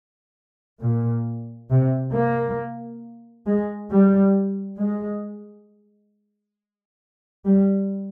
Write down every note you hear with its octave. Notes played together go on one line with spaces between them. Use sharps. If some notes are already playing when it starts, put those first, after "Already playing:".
A#2
C3
A#3
G#3
G3
G#3
G3